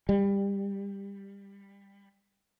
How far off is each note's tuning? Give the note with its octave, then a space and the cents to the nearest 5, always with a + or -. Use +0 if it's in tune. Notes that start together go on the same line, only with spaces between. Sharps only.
G3 +20